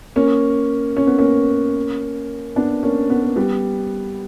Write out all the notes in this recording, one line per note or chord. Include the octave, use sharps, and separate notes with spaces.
A#3 C#4
C#4
B3
A#3 C#4
B3 D4
A#3 C#4
B3
A#3
G3 B3